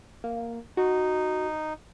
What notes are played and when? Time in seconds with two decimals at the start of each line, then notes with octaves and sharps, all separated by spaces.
0.24 A#3
0.77 D#4 F#4